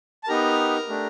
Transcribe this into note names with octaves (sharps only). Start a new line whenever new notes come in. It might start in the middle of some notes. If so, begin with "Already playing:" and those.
A5
B3 D#4 G4 A#4 A#5
A3 D4 G4